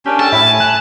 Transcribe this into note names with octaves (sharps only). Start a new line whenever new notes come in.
C#4 D4 G4 A#4 G5
A4 G5 A5
A2 E4 C#5 E5
G#5
F#6